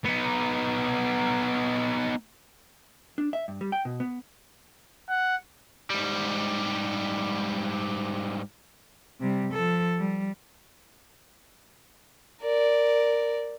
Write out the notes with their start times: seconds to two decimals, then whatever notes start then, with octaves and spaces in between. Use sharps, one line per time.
0.05 B3 D#4
3.18 D4
3.33 E5
3.48 G2
3.61 G3
3.72 G5
3.85 B2
4.00 B3
5.09 F#5
5.90 G#2 G3
9.21 C3 G3
9.53 F3 A4
9.98 G3
12.41 A#4 D5